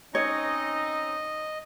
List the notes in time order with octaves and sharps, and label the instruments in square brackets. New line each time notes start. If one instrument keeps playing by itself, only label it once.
[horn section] C4 C#4 D#4 [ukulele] C#5 [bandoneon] D#5